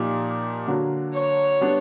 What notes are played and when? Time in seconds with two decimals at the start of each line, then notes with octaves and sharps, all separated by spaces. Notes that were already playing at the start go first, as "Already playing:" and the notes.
Already playing: A#2 F3 A#3 D#4 G4
0.67 D3 F#3 A#3 D4 F#4
1.14 C#5
1.61 G3 B3 D4